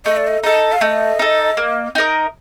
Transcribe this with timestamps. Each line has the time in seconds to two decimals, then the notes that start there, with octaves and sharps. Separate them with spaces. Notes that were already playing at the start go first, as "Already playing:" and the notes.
0.05 A3 D#5
0.17 D5
0.27 D#5
0.44 D#4 A4 D#5
0.72 F5
0.81 A3 D#5
1.19 D#4 A4
1.57 A#3
1.95 D#4 A#4 D#5